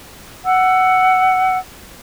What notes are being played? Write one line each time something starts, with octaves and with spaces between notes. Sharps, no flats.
F#5 E6